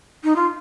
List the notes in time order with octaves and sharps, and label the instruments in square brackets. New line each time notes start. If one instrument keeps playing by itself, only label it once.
[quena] D#4
F4